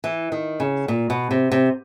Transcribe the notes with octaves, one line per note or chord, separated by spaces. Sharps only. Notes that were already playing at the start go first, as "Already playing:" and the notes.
E3
D#3
C#3
A#2
B2
C3
C3